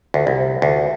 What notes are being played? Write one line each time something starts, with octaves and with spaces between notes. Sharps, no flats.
D2
C2
D2